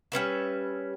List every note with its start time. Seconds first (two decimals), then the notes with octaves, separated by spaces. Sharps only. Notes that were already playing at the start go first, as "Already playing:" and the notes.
0.12 G3 C#4 B4 E5